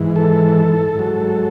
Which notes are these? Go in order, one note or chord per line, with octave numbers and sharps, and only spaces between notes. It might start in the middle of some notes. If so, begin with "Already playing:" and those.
Already playing: G#2 E3
A4
G#2 F#3